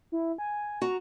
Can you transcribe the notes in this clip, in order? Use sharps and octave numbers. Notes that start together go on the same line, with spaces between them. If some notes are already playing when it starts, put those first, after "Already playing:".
E4
G#5
F#4 A#5